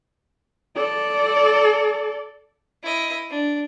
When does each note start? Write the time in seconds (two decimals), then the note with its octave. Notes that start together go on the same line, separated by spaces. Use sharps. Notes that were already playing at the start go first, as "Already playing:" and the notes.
0.76 A4 D5
2.83 E4 D#5
3.30 D4